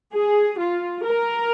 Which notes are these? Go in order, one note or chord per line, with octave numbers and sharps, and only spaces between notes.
G#4
F4
A#4